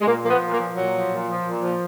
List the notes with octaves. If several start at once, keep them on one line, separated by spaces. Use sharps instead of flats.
G#3
A#2 A#3
F3 A#3
B3
A#2
A#3
F3
A#2 F#3
F3
A#2
F3
A#2
F3